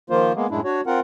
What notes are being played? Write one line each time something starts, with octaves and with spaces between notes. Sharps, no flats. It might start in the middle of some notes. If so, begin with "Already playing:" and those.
D#3 F3 A#3 F4 C5
G#3 A#3 B3
F#2 A2 G#3 D4 E4
D4 F#4 C#5
C4 F4 A#4 F#5